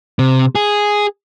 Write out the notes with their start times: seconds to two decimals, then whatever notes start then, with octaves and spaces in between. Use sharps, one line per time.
0.19 C3
0.55 G#4